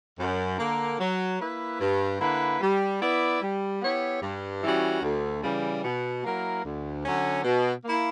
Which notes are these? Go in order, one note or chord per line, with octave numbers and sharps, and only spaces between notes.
F#2
D3 A#3
F#3
A#3 E4 B4
G2
D3 A#3 E4 B4
G3
B3 E4 B4 D5
G3
B3 E4 G4 C#5
G2
E3 G3 C#4 F#4
D2
C#3 E3 G3
B2
F#3 A#3 E4 A#4
D2
D3 F#3 C#4
B2
A#3 E4